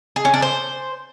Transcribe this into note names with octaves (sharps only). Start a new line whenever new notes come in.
G#4
C#4
D4
C5